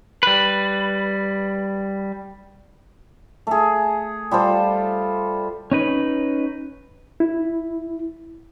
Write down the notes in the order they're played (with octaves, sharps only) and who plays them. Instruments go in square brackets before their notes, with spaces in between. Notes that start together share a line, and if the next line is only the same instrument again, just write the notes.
[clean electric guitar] G3 B4
[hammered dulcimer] A3 G#4
G3 F4 A4 C5
[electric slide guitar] C#4 D#4 B4
[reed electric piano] E4